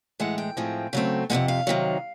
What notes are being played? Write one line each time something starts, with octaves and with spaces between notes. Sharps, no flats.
A2 E3 G#3 F#5
G5
A2 F3 G#3 C4
C#3 F#3 A3 C4
F2 C3 F3 G#3 F#5
F5
C3 D#3 F#3